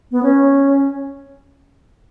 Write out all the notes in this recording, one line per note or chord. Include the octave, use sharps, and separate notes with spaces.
B3
C#4